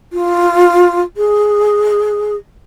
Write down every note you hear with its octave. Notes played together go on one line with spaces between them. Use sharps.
F4
G#4